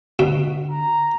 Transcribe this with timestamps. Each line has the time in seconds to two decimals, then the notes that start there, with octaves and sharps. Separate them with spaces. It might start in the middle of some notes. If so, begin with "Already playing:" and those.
0.19 B2 D3
0.71 A#5